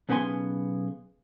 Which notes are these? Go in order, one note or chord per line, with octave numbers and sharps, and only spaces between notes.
B1 C#3 B3 F4 G#5 C6